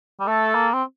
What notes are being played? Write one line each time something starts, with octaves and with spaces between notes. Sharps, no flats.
G3
A3 A4
A#3
C4